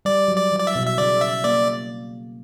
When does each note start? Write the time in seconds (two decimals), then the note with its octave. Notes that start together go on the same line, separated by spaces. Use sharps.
0.05 G3 D5
0.28 F#3
0.36 D5
0.52 E3
0.59 D5
0.67 E5
0.75 B2
0.87 E5
0.98 C#3 D5
1.21 E5
1.44 A#3 D5